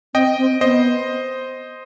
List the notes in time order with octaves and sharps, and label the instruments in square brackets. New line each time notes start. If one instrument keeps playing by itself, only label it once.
[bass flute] C4 [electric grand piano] D#5 G5
[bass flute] C4
[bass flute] B3 [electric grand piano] C5 D#5